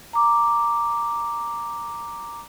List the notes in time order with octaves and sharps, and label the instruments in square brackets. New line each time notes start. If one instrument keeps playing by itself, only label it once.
[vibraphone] A#5 D6